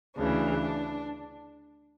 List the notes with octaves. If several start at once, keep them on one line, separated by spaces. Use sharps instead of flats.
D2 C#3 E3 D4